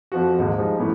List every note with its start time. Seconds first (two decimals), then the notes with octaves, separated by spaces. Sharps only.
0.12 F2 F3 F#4
0.38 G#1 D#2 G#2
0.58 F3 G3 G#3 D#4
0.78 F#2 A2 E3 B3